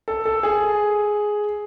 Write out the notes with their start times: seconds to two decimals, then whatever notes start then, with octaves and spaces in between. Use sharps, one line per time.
0.08 A4
0.25 A4
0.43 G#4